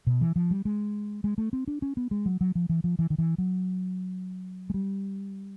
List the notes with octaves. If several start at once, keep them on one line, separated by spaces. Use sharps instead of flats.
B2
E3
F3
G3
G#3
G#3
A3
C4
D4
C#4
B3
G#3
F#3
F#3
F3
E3
F3
E3
D#3
E3
F#3
G#3
G3